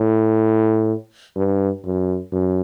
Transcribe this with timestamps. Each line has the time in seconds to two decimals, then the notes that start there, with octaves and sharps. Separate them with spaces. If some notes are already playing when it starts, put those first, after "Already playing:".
Already playing: A2
1.36 G2
1.84 F#2
2.32 F#2